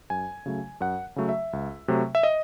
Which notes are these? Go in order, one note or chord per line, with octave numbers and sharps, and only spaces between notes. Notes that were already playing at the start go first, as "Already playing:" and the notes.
F#2 G#5
C#3 F#3 A3
F#2 F#5
C#3 F#3 A3
E5
C#2
C3 F#3 A3
E5
D#5